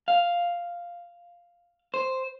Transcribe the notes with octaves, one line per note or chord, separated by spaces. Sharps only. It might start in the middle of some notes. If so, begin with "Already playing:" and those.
F5
C5